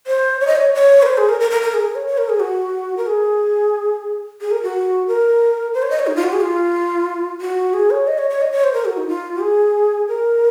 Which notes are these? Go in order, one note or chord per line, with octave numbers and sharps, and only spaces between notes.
C5
C#5
D#5
C#5
C#5
A#4
C5
G#4
A#4
A#4
A#4
A#4
G#4
A#4
C#5
C#5
A#4
G#4
F#4
A#4
G#4
G#4
A#4
F#4
A#4
C5
C#5
D#5
C#5
D#4
F4
F#4
G#4
F4
F#4
G#4
C#5
D#5
C#5
C#5
D#5
C#5
C5
A#4
F#4
D#4
F4
G#4
A#4